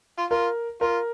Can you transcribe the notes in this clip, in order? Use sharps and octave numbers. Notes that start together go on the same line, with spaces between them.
F4
F4 A#4
F4 A#4